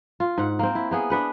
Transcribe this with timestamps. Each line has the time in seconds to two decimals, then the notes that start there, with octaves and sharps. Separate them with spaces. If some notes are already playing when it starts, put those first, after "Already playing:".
0.20 F4
0.38 G#2 F#5
0.59 A#3 C4
0.75 E4
0.91 A#3 B3 G#4
1.10 D4 B4 F#5